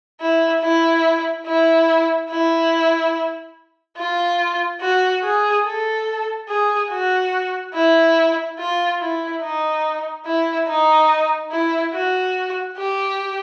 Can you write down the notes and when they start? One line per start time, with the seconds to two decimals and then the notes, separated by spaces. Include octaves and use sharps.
0.21 E4
0.62 E4
1.46 E4
2.30 E4
3.98 F4
4.81 F#4
5.24 G#4
5.65 A4
6.49 G#4
6.91 F#4
7.74 E4
8.59 F4
9.01 E4
9.42 D#4
10.26 E4
10.68 D#4
11.51 E4
11.93 F#4
12.77 G4